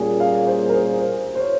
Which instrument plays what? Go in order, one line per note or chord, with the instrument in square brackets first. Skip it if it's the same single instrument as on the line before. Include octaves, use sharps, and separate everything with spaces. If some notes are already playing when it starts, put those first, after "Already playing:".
Already playing: [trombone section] A#2 G3 A#3 C#4 G#4
[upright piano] F5
C5
A#4
C5
C5
C5
C#5